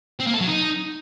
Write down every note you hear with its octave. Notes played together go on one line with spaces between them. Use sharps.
C4
A#3
A4
F#3
D#4